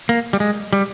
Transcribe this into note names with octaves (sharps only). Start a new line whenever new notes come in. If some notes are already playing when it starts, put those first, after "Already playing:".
A#3
G3
G#3
G3